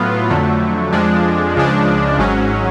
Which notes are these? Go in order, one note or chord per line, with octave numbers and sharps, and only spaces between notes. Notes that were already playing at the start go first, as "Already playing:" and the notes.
Already playing: A2 F#3 B3 F4
F2 D3 F#3 A3
F2 F3 G#3 D4
C#2 C#3 F3 G#3 D4
G#1 G#2 F#3 C#4